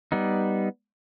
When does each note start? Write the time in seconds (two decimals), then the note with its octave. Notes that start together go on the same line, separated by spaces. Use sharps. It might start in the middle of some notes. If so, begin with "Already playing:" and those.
0.12 G3 B3 D#4